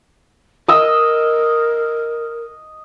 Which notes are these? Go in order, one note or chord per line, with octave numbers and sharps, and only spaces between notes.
A#4 D#5 E6